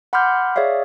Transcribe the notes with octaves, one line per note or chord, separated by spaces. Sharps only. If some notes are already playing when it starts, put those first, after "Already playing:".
F#5 B5 C6 D6 F6 G6
G#4 C#5 D5 E5 F5